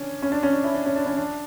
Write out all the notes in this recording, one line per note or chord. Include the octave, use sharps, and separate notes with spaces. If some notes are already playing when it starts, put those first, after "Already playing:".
Already playing: C#4 D4
C#4
D4
C#4
D4
E4
D4
C#4
D4
C#4
D4